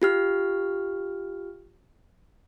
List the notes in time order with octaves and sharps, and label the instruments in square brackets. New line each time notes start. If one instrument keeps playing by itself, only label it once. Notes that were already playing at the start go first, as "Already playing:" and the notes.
[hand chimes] F4 G4 F6